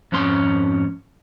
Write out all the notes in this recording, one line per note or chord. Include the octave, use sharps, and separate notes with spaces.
F2 G#2 C#4 C6